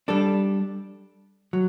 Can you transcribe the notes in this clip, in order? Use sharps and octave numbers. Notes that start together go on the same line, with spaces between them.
G3 D4 A4
F#3